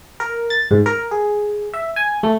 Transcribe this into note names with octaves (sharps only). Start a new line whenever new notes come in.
A#4
A6
G#2
A#4
G#4
E5
G#5
A3